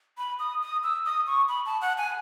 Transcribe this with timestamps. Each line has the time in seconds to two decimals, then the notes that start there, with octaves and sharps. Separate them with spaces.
0.18 B5
0.39 D#6
0.62 D#6
0.83 E6
1.06 D#6
1.27 C#6
1.49 B5
1.66 A5
1.81 F#5
1.98 G#5